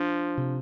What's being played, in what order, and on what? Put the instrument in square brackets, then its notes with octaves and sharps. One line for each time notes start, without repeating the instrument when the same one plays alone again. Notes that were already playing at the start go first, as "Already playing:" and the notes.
Already playing: [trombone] F3 [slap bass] D4
[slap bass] C3